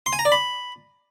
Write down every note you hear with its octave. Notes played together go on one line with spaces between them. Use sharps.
C6
G#5
A#5
D5
B5